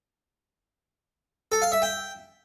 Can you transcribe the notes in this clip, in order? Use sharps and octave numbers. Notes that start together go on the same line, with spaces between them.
A4
F5
E5
G5